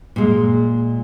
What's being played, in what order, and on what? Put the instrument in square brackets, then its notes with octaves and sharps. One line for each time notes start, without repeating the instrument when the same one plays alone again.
[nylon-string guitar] A#2 G#3